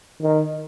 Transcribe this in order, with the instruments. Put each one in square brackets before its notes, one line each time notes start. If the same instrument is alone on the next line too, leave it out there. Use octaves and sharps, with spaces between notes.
[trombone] D#3